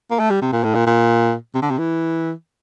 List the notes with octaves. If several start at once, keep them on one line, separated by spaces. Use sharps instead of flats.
A#3
A3
G3
C3
A#2
A2
A#2
A#2
C3
D3
C3
E3